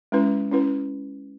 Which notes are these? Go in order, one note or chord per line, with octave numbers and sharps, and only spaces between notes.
G#3 C#4 E4 B4
C#4 E4 B4